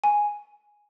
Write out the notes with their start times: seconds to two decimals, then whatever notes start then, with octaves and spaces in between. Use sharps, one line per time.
0.04 G#5